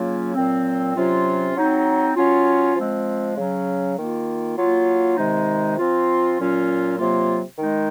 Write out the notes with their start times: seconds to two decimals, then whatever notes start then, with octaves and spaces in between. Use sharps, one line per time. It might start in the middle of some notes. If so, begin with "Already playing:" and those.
Already playing: C#3 F#3 A#3 C#4 F4
0.35 A#2 F#3 C4
0.95 C3 F#3 C#4 F4
1.55 F#3 C4 D#4
2.16 F#3 C#4 F4
2.75 F3 G#3 C4
3.36 C#3 F#3 C#4
3.96 D#3 A#3 F4
4.57 F#3 A#3 F4
5.17 C3 D#3 G#3 D#4
5.78 F3 C4 F4
6.39 A#2 F#3 C#4 F4
6.99 C3 F#3 A#3 F4
7.58 D#3 G#3 D#4